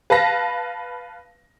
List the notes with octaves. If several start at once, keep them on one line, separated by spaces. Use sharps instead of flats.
B4 F5 A5 A#6 B6